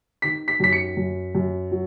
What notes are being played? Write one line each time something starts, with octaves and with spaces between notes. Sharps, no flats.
D#3 B6
B6
F#2 B6
C#7
F#2
F#2
F#3